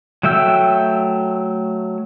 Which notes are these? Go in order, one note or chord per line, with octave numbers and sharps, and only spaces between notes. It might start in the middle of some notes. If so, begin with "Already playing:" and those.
F#3 A3 E5 G5 E6